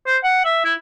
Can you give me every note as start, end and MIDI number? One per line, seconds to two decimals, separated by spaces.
0.06 0.17 72
0.24 0.42 78
0.45 0.62 76
0.65 0.73 64